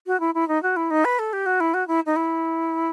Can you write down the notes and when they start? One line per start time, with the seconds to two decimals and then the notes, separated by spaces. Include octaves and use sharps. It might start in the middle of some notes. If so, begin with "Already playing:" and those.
0.07 F#4
0.20 E4
0.35 E4
0.48 D#4
0.63 F#4
0.76 E4
0.91 D#4
1.05 B4
1.19 A4
1.33 G4
1.46 F#4
1.60 E4
1.74 F#4
1.88 E4
2.06 D#4
2.16 E4